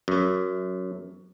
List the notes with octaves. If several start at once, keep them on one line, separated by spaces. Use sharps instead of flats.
F#2